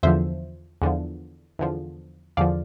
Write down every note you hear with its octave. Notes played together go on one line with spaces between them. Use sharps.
E2 D3 F3 C5 E5
E2 D3 F3
E2 D3 F3
E2 D3 F3 D5 F5